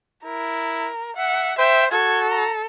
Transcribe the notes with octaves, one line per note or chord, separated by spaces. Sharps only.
E4 A#4
E5 F#5
C5 E5 G5
F#4 A4 G#6
A#5